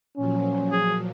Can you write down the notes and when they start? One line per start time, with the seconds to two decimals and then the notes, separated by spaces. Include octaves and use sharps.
0.17 A#2 F3 F#3 C#4
0.72 G#4